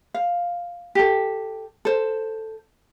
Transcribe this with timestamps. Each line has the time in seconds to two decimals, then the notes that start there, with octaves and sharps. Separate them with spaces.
0.14 F5
0.95 G4 A4
1.85 A4 C5